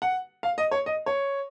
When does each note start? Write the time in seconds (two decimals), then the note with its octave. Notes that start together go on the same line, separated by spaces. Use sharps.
0.02 F#5
0.43 F5
0.58 D#5
0.71 C#5
0.86 D#5
1.06 C#5